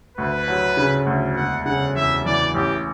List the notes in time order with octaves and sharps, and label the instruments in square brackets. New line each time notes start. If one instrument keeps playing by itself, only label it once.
[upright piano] D2 [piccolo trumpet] B4
[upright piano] F#3
C#3
D2
[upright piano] E1 [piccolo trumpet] F#5
[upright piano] C#3 [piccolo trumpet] F#5
[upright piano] E2 [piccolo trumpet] E5
[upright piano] E3 [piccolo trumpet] D5
[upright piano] A1 [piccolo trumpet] G4